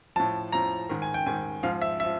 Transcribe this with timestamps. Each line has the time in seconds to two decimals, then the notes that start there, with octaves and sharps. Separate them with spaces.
0.16 A2 F3 A5
0.52 A2 F3 A#5
0.89 G#2 D#3
1.02 G#5
1.14 G5
1.26 G#2 D#3 G#5
1.63 G#2 F3 F5
1.82 E5
2.00 F3 E5